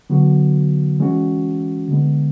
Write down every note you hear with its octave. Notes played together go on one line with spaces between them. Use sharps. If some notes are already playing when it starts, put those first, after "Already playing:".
D3 F#3 B3 F#4
E3 G#3 C#4 F#4
D3 G#3 B3